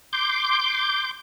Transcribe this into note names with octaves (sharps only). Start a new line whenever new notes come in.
C6 D6 G6